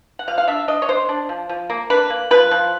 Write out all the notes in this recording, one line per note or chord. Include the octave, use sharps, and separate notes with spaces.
F#5
F3 F5
F5
D4 E5
D4 D#5
C#5
D4 C5
D4
F3
F3
A#3
D4 B4
A#3
F3 B4
F3